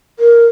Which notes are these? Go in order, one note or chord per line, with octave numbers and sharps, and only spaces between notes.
A#4